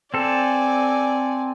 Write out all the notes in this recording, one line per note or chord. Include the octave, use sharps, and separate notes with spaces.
C4 A4 D5 G#5